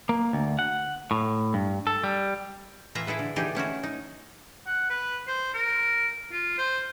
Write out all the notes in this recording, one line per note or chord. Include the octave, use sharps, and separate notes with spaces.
A#3
D2
F#5
A2
G2
A4
G3
A2 E3 F4 E5 A#5
E4 G#4 A4 B4
D3
D3 E3 D4 D#4 G4 G#4
A3 C#4 E4 F#4
D#4
F#5
B4
C5
A#4
F4
C5